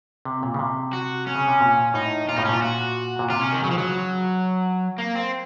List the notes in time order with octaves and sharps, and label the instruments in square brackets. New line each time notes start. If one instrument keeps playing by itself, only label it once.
[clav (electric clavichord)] C3
A#2
C#3
C3
[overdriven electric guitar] F#4
C#4
[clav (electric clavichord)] C#3
C3
A#2
[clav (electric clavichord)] A2 [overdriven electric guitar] D#4
[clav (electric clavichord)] A#2 [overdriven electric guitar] F4
[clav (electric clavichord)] A2 [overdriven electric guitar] D#4
[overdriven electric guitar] C#4
[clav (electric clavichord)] A#2
[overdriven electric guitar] F4
F#4
[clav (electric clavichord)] A#2
[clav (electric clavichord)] C3 [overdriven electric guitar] F4
[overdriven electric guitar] C#4
D#3
[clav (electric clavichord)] C#3 [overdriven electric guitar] F#3
[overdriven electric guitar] F3
F#3
A#3
C4